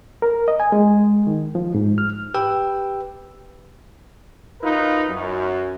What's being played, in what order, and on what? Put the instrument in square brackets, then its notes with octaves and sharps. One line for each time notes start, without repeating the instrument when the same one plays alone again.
[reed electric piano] A#4
D#5
G#5
G#3
D#3
F3
G#2
F6
[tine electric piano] G4 B4 G5 E6
[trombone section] F#2 D#4 F4 A#4 B4
F#2